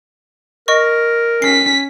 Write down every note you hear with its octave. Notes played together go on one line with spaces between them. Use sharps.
A#4 D#5 C#6
C#4 B6 C7